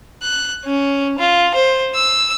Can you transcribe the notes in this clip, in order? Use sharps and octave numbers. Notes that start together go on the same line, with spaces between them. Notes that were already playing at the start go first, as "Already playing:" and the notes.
F#6
C#4
F4
C5
E6